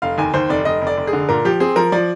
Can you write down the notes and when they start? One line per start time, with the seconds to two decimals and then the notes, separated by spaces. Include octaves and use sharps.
0.02 F1 F5
0.18 D#2 G#5
0.34 D#2 C5
0.49 F1 D5
0.65 F1 D#5
0.82 F1
0.87 D5
0.97 F1
1.07 G#4
1.13 D3
1.29 A#2 A#4
1.45 F3 G4
1.60 C4 G#4
1.76 F3 A#4
1.92 F3 D5